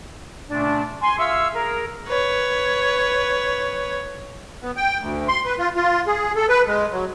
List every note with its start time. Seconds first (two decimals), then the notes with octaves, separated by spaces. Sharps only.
0.48 A#2 C#3 A3 C#4 D4
1.02 G#5 C6
1.19 F4 G#4 E5 F5 C#6 E6
1.54 G#4 A#4
2.08 B4 C#5
4.62 B3
4.77 G5
5.00 D2
5.28 C6
5.45 B4
5.59 F4
5.76 F4
6.07 G#4
6.36 A4
6.49 B4
6.67 G#3
6.92 F#3